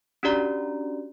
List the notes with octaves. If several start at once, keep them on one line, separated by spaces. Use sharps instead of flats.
C#4 D4 F#4 G4 D5 A#5